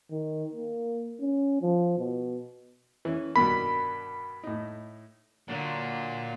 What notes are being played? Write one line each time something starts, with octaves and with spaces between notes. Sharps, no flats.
D#3
A#3
C#4
F3
B2
E3 C#4
G2 B2 D#3 B5
A2 D#4
A#2 D3 F#3